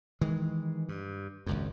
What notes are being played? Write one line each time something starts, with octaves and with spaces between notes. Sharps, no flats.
D#3 E3 G#3
G2
G#1 C#2 F#2